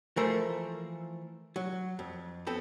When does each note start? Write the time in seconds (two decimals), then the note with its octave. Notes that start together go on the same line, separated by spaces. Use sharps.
0.17 E3 F3 A3 A#4 C5
1.56 F#3
1.99 F2
2.47 B3 C4 A4